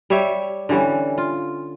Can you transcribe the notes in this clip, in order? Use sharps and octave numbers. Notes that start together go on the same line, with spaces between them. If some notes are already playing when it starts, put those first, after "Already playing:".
G3 G4 C#5 E5
D3 E3 G3 C#4
F4